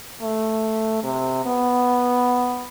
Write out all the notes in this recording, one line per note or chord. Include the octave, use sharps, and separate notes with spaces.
A3
C3
B3